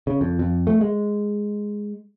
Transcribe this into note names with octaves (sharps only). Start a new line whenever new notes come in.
C#3
F2
F2
A3
G#3